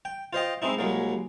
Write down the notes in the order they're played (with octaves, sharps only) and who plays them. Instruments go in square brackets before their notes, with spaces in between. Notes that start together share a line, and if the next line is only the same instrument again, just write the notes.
[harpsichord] G5
F4 C5 D#5 G5
G#3 C4 D#4 E4
C2 F#3 G#3 A#3